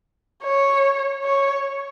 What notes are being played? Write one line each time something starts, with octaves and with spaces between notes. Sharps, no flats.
C#5
C#5